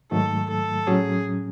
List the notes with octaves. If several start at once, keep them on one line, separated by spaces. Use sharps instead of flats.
G#2 D#3 F#3 A3 A4
A4
A2 F#3 C#4 G#4